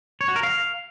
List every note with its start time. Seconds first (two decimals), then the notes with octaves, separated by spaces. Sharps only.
0.21 C#5
0.28 F#4
0.36 A#4
0.43 F5